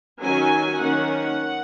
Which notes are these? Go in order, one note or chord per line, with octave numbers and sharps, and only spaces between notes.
D#3 F#3 C#4 G#5
D#3 A#3 C#4 F#5